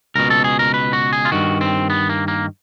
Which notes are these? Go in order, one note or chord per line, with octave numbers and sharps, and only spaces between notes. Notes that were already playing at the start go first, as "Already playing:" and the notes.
C#2 B2 A#4
A4
G#4
A#4
B4
F#4
G#4
F4
G2 D#3 F#4
C4
B3
A#3
A#3